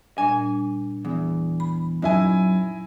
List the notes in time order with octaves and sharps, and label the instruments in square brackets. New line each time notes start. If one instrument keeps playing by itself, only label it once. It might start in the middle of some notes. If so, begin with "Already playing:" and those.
[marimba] A#2 G3 D4 [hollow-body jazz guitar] G#5
[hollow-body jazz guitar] E2
[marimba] B5
[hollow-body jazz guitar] F#2 [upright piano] D#4 E4 G#5